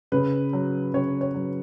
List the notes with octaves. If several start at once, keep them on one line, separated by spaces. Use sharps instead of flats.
C#3 B4
F#3
C#3 C#5
C#5
F#3